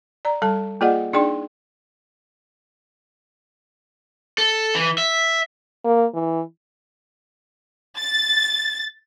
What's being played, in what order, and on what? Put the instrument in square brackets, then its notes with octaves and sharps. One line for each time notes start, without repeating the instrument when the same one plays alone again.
[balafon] D5 A#5
G3 A4 A5
A#3 F4 G#4 D5 D#5 F#5
D4 D#4 G#4 D5 G5 C6
[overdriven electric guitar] A4
E3
E5
[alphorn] A#3
E3
[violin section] A6